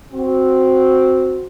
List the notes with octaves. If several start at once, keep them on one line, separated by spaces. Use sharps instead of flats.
C4 F#4